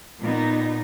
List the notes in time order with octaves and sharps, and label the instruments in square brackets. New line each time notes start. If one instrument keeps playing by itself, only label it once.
[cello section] A#2 B3 D#4